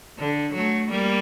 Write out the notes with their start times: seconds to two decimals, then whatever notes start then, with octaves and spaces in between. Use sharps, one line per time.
0.19 D3
0.54 F#3 A3
0.91 G3 A#3